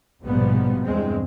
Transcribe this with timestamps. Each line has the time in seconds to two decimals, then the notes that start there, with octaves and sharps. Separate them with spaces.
0.21 A#1 G#2 B2 F3 G3 B3
0.84 E2 G2 G#3 C4